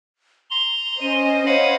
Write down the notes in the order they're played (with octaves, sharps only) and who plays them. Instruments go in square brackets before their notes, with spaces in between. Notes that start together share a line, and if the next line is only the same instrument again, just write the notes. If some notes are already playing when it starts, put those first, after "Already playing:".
[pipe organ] A#5 C6 [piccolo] G7
[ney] C#4 [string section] C5 D#5 [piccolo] D#7
[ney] C#5 [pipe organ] F5 F#5 B5